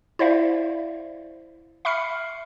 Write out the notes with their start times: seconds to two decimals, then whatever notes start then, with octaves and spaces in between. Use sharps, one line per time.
0.19 E4 C5 D5 E5 F5
1.85 E5 B5 C#6 F6 C7 C#7